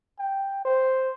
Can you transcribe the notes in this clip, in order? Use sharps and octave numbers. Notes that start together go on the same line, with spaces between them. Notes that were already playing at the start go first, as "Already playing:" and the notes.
G5
C5